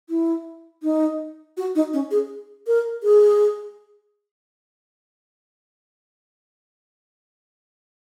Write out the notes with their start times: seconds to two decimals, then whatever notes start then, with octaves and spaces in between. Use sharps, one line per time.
0.10 E4
0.83 D#4
1.57 F#4
1.75 D#4
1.93 C#4
2.11 G#4
2.67 A#4
3.03 G#4